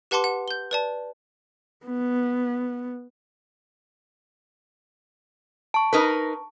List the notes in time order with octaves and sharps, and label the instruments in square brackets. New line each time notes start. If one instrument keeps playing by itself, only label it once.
[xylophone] G4 B4 F#5 A5 C6 D6
F#5
G6 G7
B4 D5 A5
[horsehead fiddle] B3
[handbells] A5 C#6
[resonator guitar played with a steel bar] D#4 A#4 B4